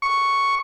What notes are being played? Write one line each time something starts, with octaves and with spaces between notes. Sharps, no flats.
C#6